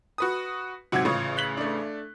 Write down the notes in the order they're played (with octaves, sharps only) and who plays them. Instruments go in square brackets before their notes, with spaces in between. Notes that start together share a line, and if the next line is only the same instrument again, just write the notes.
[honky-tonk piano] F#4 B4 D#6
[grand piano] G#2 C3 F#3 [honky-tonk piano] F#4 F#5 G#6
[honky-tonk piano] A1 C#3 [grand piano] F4 C#6 D#6
[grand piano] F#6 B6 F#7
A3 D4